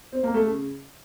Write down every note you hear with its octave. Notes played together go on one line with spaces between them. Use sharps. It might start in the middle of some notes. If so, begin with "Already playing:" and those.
C4
A#3
A3
C#3